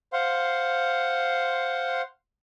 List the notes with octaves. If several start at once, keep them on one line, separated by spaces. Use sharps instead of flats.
C5 F5 F#5 C6